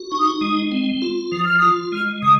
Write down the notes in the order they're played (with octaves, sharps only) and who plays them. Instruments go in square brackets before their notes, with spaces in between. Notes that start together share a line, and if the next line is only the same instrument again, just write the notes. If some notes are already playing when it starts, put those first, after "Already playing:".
Already playing: [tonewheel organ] F#4
[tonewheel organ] D#4 [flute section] C#6
[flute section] D#6
C#6
[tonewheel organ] G#3 [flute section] D#6
[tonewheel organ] C4
F4
[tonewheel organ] F3 [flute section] D#6
[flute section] F6
[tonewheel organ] F4 [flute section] D#6
[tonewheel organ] G#3 [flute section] F6
[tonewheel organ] C#3 [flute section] D#6